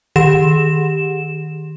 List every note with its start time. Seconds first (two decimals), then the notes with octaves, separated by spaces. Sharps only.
0.16 D#3 G4 E7